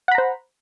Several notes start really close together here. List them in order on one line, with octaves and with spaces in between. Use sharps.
F#5 B5 A#5 C5